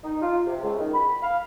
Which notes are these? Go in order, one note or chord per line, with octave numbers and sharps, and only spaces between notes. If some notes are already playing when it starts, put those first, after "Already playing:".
D#4
F4
C3
C#2
D#3
B5
F5